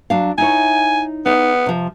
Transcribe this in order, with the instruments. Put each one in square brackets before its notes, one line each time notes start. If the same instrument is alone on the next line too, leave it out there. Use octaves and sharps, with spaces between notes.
[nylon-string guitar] F#3 D4 F5
[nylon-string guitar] D#4 E4 C#5 [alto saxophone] G#5
[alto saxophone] B3 [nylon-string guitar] D#4
[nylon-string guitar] C3 F3